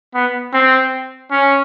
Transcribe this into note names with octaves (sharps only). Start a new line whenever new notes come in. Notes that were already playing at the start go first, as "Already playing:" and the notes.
B3
C4
C#4